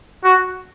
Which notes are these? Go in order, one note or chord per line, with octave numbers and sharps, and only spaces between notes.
F#4